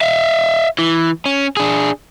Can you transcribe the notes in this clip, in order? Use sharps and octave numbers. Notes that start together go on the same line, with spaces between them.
E5 F5
E3
C#4
D4 G#4